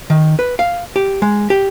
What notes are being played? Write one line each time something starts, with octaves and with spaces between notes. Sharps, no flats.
D#3
B4
F5
G4
G#3
G4